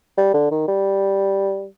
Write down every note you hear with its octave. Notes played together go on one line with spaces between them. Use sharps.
G3
D3
D#3
G3